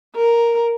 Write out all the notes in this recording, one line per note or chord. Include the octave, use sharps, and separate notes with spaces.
A#4